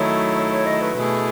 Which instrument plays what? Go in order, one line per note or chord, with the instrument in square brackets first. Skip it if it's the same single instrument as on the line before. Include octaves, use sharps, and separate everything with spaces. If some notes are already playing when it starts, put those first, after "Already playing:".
Already playing: [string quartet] D#3 F#3 A3 E4 [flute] C#5
[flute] C#5
C#5
D#5
B4
[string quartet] B2 A3 E4 G#4